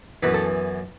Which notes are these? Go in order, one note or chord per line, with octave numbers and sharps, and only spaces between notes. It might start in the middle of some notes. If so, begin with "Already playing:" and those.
F#2 E3 B3 B4
A4